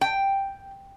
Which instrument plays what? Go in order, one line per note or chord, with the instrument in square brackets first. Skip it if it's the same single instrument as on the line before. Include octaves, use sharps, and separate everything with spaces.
[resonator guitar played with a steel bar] G5